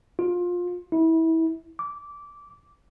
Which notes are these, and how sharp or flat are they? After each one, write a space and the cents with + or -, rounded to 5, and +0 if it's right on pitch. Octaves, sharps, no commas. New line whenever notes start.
F4 +20
E4 -25
D6 -15